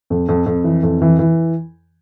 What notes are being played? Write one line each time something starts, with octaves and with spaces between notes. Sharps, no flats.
F2
F2
F2
E3
F2
E3
E3